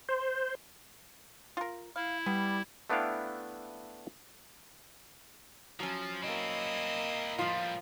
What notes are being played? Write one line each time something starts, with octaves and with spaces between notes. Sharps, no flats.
C5
F4 A#4
E4 F5
G3 B3
A3 B3 D4 E4 F5 G5
F3 F#3 C#4
A#3 C4 E4 D#5
A2 F3 G3 F4